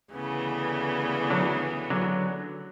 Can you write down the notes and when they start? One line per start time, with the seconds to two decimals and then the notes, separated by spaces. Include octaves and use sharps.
0.11 D2 C#3 E3 B3
1.30 D3 F#3
1.90 D3 F#3